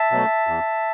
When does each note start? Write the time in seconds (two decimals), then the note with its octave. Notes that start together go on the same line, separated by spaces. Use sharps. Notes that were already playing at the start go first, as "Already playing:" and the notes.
Already playing: E5 A5
0.11 B2 F#3 A3
0.47 E2